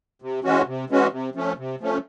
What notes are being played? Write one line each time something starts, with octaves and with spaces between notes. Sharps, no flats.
C3
E3 G#3 C#4 F#4
C3
E3 G#3 C#4 F#4
C3
F3 A3 C#4
C3
F3 A3 C#4